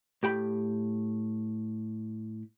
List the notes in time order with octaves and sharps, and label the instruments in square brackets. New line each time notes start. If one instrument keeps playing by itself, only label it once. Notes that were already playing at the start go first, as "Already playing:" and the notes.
[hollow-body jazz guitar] A2 G4 G5 B5